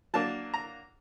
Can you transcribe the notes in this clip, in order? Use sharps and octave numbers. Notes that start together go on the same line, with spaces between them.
F#3 A#3 D4 A5
A#5